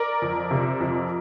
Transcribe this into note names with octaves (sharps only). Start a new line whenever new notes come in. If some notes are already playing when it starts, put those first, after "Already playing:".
Already playing: A#4 D5
F2
C3
F2